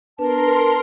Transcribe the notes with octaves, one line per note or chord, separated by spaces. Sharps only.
B3 D4 A#4 B4 A5 C6